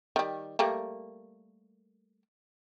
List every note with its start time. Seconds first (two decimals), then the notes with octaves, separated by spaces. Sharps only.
0.16 D#3 G3
0.59 G3 A3 A#3